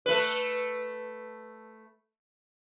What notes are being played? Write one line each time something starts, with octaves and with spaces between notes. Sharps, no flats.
A3 B4